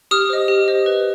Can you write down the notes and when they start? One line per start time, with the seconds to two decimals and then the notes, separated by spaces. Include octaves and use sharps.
0.11 G4 D#6 F6
0.29 C5 D#5
0.48 G4
0.68 C5 D#5
0.86 B4